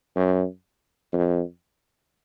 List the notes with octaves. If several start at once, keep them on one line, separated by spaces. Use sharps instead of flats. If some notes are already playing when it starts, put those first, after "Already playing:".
F#2
F2